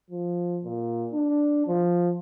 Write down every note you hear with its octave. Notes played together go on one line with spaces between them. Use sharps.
F3
A#2
D4
F3